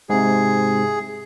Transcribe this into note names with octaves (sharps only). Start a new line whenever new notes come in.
G#2 C3 G#4